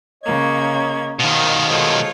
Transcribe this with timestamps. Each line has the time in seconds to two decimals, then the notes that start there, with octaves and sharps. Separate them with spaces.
0.23 C#3 A#3 C#5 D#5 G#6
1.20 B2 D#3 A#3 C5
1.68 G#3 F4 A4 C5 C#5